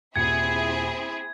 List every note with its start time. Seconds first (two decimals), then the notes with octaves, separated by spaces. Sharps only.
0.16 D#1 A#2 C4 E4 G#4 G#6 C#7